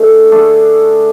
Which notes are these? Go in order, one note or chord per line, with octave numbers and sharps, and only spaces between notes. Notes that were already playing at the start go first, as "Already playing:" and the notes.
Already playing: D3 A3 D4 G#4
D3 A3 D4 G#4